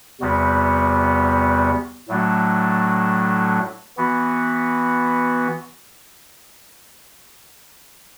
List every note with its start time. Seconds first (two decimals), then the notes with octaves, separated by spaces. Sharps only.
0.20 E2 C3 G3 B3 F#4
2.08 A2 F#3 A3 D4 F#4
3.97 E3 B3 F#4